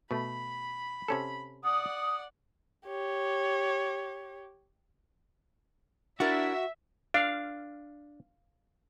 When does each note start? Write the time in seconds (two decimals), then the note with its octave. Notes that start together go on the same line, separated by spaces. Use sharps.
0.11 B2 A3 B5
1.08 C3 C#4 A4
1.64 D5 F#5 D#6
2.87 G4 C#5
6.20 D4 E4 F#4 A#4 E5
7.14 D4 F5